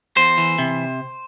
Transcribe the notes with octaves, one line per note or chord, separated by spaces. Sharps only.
E2 C5
E3
C3